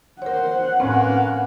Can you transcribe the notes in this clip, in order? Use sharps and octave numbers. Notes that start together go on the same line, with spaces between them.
A#4 C5 C#5 F#5
A2 A#3 C4 C#4 B4